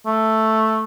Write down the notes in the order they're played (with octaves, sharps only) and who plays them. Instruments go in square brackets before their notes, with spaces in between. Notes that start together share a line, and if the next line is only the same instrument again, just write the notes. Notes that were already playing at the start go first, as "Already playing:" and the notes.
[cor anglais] A3